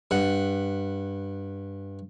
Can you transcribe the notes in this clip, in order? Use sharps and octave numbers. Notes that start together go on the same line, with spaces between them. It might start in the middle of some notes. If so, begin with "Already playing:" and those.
G2 F#5